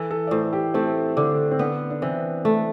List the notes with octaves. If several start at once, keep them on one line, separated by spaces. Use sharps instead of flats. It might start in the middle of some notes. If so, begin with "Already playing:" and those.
Already playing: E3 A4
A4
D5
A2 C5
G4
A3 C4
D3 D4
C4
B3 D4
D4
E3 C4
A3